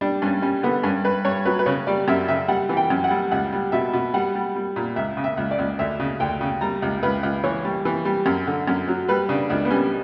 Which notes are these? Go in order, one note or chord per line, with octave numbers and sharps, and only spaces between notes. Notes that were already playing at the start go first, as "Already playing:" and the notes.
G3 D4
G2 C#4
G3 C#4
D3 B3
G2 C#4
G2 B4
G2 C#5
F#3 B4
B4
C#3 C#5
G3 D5
F#2 E5
C#3 E5
G3 F#5
E3
G5
F#2
F#5
G3
C#2 F#5
G3
B2 E5
B2
G3 F#5
G3
G3
A#2
C#2 E5
C#3
E5
C#2
D5
C#2
D2 E5
C#3
D2 G5
C#3
G3 A#5
C#2
C#2 B4
C#2
E3 C#5
G3
E3
G3
F#2
D3
F#2
F#3
G3 B4
C#3 D4
C#2 D4
B3
G3 C#4